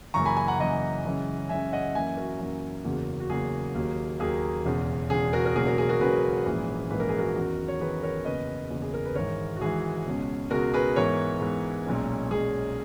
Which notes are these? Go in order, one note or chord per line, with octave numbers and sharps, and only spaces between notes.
F#1 F#2 E3 A#3 A#5 C#6
G#5 B5
G#5 B5
F#5 A#5
F#1 F#2 E3 A#3 D#5 F#5
F#1 F#2 E3 G#3 C#4
F#1 F#2 E3 G#3 C#4 E5 G#5
D#5 F#5
F#2 E3 A#3 C#4 E5 G#5
F#4 A#4
F#2 E3 A#3 C#4
F#1 E2 C#3 F#3 A#3
F#4
F#1 E2 C#3 F#3 A#3 G#4
D#2 D#3 F#3 A#3
D#2 D#3 F#3 A#3 G#4
E1 E2 C#3
E1 E2 C#3 G#4
F#4 A#4
A#4
E1 E2 C#3 F#3 A#3 G#4
F#4 A#4
G#4
F#4 A#4
E1 E2 C#3 F#3 A#3 G#4 B4
A#1 G#2 E3 A#3 C#4
A#1 G#2 E3 A#3 C#4 B4
A#4
G#4
F#4 A#4
E2 D#3 F#3 C#4
C#5
E2 D#3 F#3 C#4 G#4 B4
A#4 C#5
F#1 E2 B2 A#3 C#4 B4 D#5
F#1 E2 B2 A#3 C#4
G#4
A#4
B4
G#1 G#2 E3 A#4 C#5
F#4
G#1 G#2 E3 G#4
C#2 B2 G#3 C#4
C#2 B2 G#3 C#4 F#4 A#4
G#4 B4
G#2 E3 B3 A#4 C#5
G#2 E3 B3
B1 A#2 G#3 C#4
B1 A#2 G#3 C#4 G#4